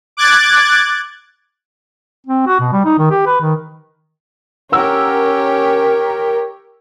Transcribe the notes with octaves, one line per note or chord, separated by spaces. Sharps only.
D6 F#6 G#6 A6
C4
F#4
B2
G3
D#4
D#3
G4
B4
D#3
C#4 G4 A#4 C#5 F#5 E6